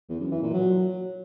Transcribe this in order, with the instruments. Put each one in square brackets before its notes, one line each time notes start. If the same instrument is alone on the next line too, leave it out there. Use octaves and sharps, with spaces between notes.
[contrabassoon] E2
F#2
E3
A#2
F#3